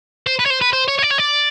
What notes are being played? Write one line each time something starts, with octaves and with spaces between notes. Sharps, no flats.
C5
B4
C#5
C5
B4
C5
C#5
C#5
D5
C#5
D5